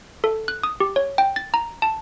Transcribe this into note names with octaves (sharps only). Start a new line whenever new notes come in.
A4
F#6
D#6
G4
C#5
G5
A6
A#5
A5